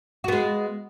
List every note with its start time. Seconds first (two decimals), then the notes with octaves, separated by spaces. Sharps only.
0.24 F#4
0.28 B3
0.32 G#3